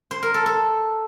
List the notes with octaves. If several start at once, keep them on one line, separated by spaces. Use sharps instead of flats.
C5
A#4
A4
A4